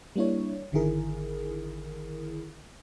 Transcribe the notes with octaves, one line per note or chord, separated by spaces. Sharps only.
G3 A#3 D4 E4 C#5
G#1 D3 D#3 E4 G#4 A#4